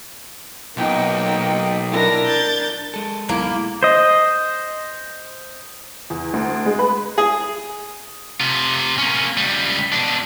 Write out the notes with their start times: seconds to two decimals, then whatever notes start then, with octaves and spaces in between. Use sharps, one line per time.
0.77 B1 A#3 D#4 G5
1.91 D4 E4 A#4 A#6
2.26 G6 A6
2.94 G#3 A4
3.29 B1 A#3 E4
3.83 C5 D#5
6.10 E2
6.33 D2
6.66 G#3
6.79 B4
7.18 G#4
8.40 C3 F4
8.98 A#3 C#4
9.37 C#2 G3
9.92 B2 D4